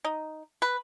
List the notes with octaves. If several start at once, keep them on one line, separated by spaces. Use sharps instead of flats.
D#4
B4